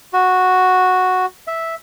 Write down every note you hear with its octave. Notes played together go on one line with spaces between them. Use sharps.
F#4
E5